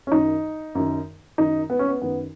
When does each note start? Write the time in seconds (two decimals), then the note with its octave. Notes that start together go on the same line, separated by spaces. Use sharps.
0.07 C#4
0.12 F#2 D#3 D#4
0.75 F#2 D#3
1.38 F#2 D#3 D#4
1.70 B3
1.79 C#4
1.88 B3
2.02 F#2 D#3 B3